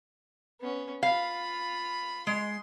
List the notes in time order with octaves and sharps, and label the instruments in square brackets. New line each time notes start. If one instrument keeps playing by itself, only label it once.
[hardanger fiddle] B3 C#4
[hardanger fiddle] F4 B5 [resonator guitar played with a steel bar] F5
[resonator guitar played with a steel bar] G#3 [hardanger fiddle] C6